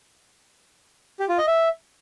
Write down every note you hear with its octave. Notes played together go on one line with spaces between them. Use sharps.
G4
F4
D#5
E5